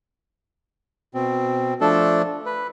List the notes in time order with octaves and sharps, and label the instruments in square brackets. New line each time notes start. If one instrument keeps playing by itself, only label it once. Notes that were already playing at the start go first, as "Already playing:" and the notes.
[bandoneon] B2 C4
F3 A3 D4 A4
B4